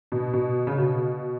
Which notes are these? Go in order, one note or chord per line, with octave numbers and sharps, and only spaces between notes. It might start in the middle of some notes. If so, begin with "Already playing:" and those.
B2
B2
C#3
B2